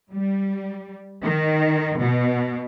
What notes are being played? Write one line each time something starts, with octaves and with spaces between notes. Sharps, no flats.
G3
D#3
B2